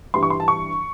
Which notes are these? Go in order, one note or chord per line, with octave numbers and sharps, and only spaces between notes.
G2 E3 G3 C6
C#6
C6
A5
C#6